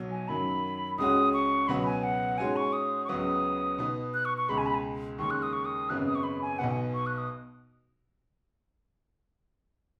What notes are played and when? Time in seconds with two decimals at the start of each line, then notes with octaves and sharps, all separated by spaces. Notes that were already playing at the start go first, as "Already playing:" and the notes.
Already playing: B1 B2 F#3
0.11 G#5
0.28 F#2 D#3 F#3 B5
0.98 C#2 C#3 G#3 C#4 F#4 D#6
1.34 C#6
1.68 C#2 B2 F#3 B3 F#4 B5
1.86 G#5
2.03 F#5
2.38 G#2 G#3 C#4 F#4 G#5
2.56 C#6
2.73 D#6
3.05 C#6
3.09 C#2 C#3 F#3 B3 D#6
3.78 B2 B3 D#4
4.14 F#6
4.25 C#6
4.38 C#6
4.49 C#2 B2 G#3 B5
4.58 G#5
4.66 B5
4.75 G#5
5.18 D#2 C#3 G#3 C#6
5.31 F#6
5.43 D#6
5.53 C#6
5.65 D#6
5.89 G#1 F#2 C#3 B3 F#6
6.07 D#6
6.15 C#6
6.24 B5
6.42 G#5
6.59 B1 B2 B3 F#5
6.71 G#5
6.94 C#6
7.06 F#6
7.18 D#6